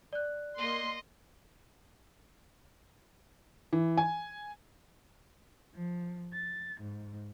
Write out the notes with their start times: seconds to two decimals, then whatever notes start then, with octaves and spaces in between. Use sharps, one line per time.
0.13 D5 F#6
0.58 A#3 D#5 C6
3.73 E3
3.97 G#5
5.74 F3
6.33 A6
6.80 G#2